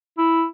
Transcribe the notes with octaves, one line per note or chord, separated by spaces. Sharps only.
E4